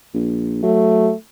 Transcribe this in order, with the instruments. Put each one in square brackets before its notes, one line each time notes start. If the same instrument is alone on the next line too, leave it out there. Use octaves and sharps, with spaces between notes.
[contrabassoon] A#1
[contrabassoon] F#3 [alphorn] A3